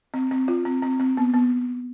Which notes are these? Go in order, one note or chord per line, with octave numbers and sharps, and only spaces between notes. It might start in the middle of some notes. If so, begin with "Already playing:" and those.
C4
C4
F4
C4
C4
C4
B3
B3